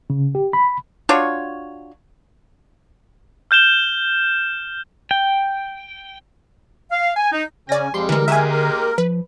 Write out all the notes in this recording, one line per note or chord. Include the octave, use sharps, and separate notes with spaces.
C#3
G4
B5
D4 F4 F#4 C#5
F6 G6 E7 G7
G5
F5
G#5
D#4
C#3 C#4 D5 G#5 A#6
F2 F3 G3 G#3 C6
D3 E3 G#3 A#4
G#3 A#3 G4 E5 G#5
A#4
F3 B4